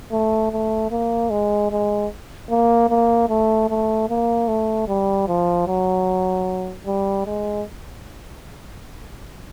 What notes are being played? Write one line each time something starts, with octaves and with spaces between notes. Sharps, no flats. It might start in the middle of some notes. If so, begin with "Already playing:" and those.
A3
A3
A#3
G#3
G#3
A#3
A#3
A3
A3
A#3
A3
G3
F3
F#3
G3
G#3